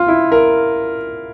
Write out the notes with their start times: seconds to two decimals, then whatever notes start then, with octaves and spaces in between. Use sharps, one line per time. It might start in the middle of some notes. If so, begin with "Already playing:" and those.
Already playing: F4
0.08 E4
0.32 A#4